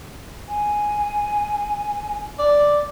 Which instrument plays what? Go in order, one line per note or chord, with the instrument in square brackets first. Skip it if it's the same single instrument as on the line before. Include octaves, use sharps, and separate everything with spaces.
[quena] G#5
[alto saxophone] D5